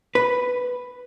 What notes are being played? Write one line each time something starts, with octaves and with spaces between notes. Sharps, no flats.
B4